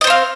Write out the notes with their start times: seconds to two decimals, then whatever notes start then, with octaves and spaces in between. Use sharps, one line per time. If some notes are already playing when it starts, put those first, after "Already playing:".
0.01 D#5
0.04 C5
0.07 C4
0.10 F5